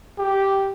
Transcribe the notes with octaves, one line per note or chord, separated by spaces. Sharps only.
G4